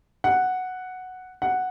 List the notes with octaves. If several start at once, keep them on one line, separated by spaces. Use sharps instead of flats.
F#5
F#5